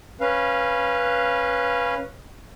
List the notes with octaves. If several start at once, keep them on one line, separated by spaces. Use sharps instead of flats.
C#4 B4 F5